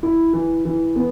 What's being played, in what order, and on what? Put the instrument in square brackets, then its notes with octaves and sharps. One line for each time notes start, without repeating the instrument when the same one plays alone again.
[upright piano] E4
E3
E3
B3